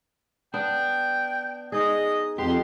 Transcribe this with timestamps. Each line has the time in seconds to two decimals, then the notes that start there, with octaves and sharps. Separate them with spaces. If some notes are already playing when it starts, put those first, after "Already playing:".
0.54 B3 D4 G5
1.72 D#4 G#4 D#5
2.38 F2 B3 G4 C6